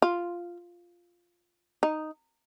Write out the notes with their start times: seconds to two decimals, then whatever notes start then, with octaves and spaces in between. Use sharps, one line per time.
0.02 F4
1.83 D#4